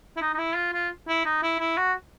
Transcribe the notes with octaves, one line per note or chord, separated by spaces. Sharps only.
E4
D#4
D#4
E4
F4
F4
E4
D#4
E4
E4
F#4